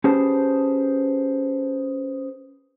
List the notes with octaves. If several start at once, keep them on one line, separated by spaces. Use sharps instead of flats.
C#4 G4 G#4 B4 C5 A5